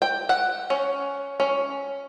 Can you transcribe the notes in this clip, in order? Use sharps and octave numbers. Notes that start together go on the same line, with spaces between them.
G5
F#5
C#4
C#4